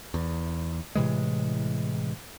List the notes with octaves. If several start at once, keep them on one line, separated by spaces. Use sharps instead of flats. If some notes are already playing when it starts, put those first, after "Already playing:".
E2
A2 C3 E3 G#3